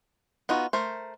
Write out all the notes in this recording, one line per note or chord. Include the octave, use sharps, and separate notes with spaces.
B3 D#4 F4 F#4
A3 A#4 C5